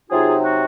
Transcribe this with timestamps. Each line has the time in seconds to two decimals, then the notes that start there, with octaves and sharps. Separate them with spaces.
0.10 C3 F#3 C4 D#4 F4 G#4
0.44 F#4